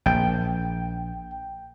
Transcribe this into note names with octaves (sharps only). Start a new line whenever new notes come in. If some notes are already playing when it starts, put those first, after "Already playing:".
A#1 G5